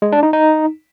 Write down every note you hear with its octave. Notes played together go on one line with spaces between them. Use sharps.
G#3
D4
D#4
D#4